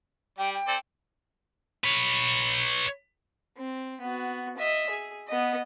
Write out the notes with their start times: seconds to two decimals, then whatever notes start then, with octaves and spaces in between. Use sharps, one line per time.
0.38 G3 G5
0.54 G5
0.67 C4 A4 D5
1.84 B4 C#5
3.57 C4
4.01 B3 F#4
4.57 D#5 E5
4.90 G#4
5.28 B3 D#5